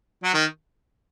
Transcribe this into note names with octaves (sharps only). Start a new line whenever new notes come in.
F#3
D#3